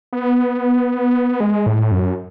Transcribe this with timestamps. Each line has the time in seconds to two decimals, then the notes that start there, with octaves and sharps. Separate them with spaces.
0.13 B3
1.40 G#3
1.66 A2
1.92 F#2